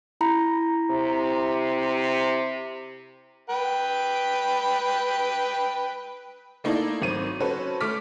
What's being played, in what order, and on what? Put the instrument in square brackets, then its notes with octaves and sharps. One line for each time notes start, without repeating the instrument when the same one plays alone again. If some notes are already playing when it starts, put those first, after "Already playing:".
[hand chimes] E4 A#5 B5
[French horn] C3
[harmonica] B4 G5
[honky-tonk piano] A3 A#3 D#4 E4 A4 D5
G#1 F#3 C4 D#7
C#4 F#4 A4 B4 C5
A3 D6 F6 B6